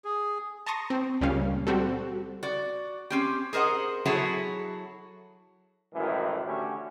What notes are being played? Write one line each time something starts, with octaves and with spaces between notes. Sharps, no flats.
G#4
A5 A#5 C6 C#6 D#6 A#6
C4
C#2 A#2 G3 C#4 F5
G3 C4 F#4 G4 A4
F#4 D5
C4 C#4 G4
G#4 A#4 C5 D#5 F#5
F#3 E4 F#4 G#4 A4 C#5
G#1 F#2 A2 D#3 E3
D3 A3 C#4 F#4 G4